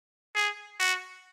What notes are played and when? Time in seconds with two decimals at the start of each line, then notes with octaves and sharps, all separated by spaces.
0.35 G#4
0.80 F#4